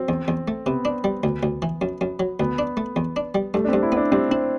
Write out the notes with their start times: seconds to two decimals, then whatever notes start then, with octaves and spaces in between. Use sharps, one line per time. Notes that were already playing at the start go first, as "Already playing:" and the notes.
Already playing: F#3 C4
0.09 E2
0.28 E2
0.48 A3
0.66 C3 B3
0.85 D4
1.04 G3
1.23 D2
1.43 D2
1.62 E3
1.81 F#2
2.01 F#2
2.20 F#3
2.39 D2 B3
2.58 D4
2.77 A3
2.96 E2
3.16 D4
3.35 G3
3.54 G2 A3
3.65 D4
3.69 G2 C4
3.83 E4
3.92 B3 D4
4.12 G2 C4
4.31 C4 E4